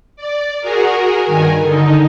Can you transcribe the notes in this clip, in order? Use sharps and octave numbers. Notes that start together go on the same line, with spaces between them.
D5
F#4 G#4 A#4
G2 D#3 A#4 G#5
D3 D#4